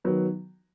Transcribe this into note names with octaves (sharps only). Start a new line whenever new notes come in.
D#3 F#3 B3